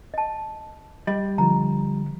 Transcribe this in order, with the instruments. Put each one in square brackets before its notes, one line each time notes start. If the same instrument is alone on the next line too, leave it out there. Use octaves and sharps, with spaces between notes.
[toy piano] D#5 A5
[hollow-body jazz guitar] G3 [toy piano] D#5
[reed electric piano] D3 F3 [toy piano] A#5